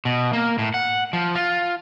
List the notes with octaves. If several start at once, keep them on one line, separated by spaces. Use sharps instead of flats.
B2
A#3
A2
F#5
F3
F4